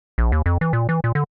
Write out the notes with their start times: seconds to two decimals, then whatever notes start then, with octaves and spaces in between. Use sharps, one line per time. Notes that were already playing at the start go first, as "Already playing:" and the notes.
0.18 A#1
0.32 D#2
0.46 F2
0.61 E3
0.73 A#2
0.89 E3
1.04 A#2
1.15 D3